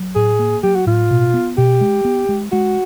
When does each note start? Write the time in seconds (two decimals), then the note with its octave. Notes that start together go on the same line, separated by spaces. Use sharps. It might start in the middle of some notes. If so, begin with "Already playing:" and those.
Already playing: F#3
0.15 A2 G#4
0.39 A#3
0.63 F#3 G4
0.76 F#4
0.86 A2 F4
1.11 B2
1.34 B3
1.57 B2 G4
1.81 G#3
2.05 B3
2.29 G#3
2.52 G#3 F#4